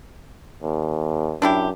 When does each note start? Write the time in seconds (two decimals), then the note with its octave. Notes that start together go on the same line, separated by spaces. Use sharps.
0.63 D#2
1.42 F#2 D4 E4 G4